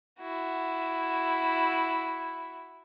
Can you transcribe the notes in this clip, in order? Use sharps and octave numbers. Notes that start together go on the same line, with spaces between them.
E4 F#4